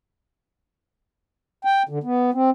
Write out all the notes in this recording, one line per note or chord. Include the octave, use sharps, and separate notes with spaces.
G5
D3
B3
C4